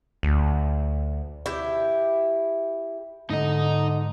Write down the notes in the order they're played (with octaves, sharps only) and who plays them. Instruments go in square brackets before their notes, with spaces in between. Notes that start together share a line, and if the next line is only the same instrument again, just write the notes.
[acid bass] D2
[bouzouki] E4 G4
[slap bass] G#2 G#3 [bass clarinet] D3 [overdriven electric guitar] D#4 D#5